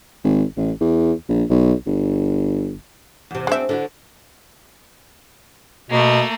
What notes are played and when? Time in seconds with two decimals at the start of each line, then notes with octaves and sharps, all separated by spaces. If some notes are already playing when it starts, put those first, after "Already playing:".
0.24 G#1
0.57 A1
0.81 E2
1.29 A#1
1.50 B1
1.86 G1
3.31 E2 C3
3.47 G#3 C4 D4 F#4 E5
3.69 D3 E4 F#4
5.90 B2 A3 A#3